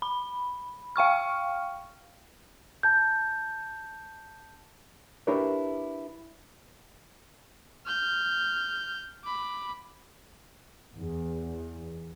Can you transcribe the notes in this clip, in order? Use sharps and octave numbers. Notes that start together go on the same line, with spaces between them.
B5
F5 G5 C#6 F6
A5 G6
D4 E4 G4 A#4 B4 C#5
F6 G6
B5 D6
E2